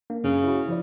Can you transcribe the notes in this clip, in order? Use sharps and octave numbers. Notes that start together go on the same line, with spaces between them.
A#3 D4
F#2 C#3
E4 F#4
F3 E4 D5